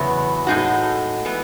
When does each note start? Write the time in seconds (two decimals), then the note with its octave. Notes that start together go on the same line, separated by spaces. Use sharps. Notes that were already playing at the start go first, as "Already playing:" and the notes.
Already playing: E2 C#3 F#3 B3 F#4
0.47 A2 G#3 D#4 F#4
1.25 E3 B3